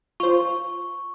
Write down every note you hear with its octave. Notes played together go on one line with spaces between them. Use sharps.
F4 C5 C#6